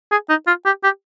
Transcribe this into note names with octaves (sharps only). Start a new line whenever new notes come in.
G#4
D#4
F4
G4
G4